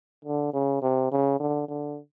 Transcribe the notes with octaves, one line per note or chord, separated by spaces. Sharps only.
D3
C#3
C3
C#3
D3
D3